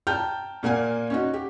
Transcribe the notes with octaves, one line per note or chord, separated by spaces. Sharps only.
G5 A5 A#5 F6 G6
A#2 A#3 F#5 G#5
C#4 D#4 F#4
G4